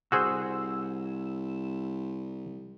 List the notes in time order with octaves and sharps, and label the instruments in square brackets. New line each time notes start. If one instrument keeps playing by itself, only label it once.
[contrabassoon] C2 [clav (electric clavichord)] F#4 G#4 C5 [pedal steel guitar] E6